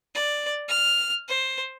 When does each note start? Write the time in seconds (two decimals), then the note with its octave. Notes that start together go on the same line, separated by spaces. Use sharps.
0.15 D5
0.68 F6
1.28 C5